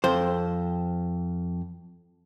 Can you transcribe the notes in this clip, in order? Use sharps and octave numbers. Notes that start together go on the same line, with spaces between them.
F2 C5